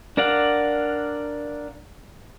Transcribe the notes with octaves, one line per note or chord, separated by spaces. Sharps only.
D4 A#4 D5 F5 F#5